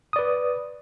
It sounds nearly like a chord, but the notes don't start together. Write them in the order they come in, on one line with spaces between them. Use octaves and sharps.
D#6 D5 B4